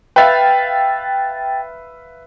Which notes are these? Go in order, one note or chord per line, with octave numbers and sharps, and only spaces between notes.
B4 E5 F5 G5 A6